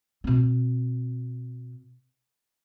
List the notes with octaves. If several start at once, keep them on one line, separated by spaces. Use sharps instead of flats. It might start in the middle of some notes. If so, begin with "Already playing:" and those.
B2 C4